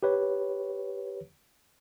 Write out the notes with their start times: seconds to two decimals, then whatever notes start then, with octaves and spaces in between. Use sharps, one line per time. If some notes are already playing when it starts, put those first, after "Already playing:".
0.03 G4 B4 C#5